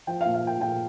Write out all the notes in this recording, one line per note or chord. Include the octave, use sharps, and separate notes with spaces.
F3 G5
F5
A#2
F5
F3 G5
A#2 G5